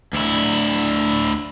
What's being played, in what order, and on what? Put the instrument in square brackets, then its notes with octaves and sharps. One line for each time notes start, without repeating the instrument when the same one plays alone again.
[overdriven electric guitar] D2 E4